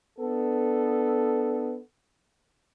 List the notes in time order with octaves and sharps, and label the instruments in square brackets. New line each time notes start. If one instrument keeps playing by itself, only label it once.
[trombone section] B3 D4 A4